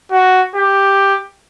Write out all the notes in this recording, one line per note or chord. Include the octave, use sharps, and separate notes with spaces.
F#4
G4